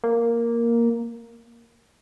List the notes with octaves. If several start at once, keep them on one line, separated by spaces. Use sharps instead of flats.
A#3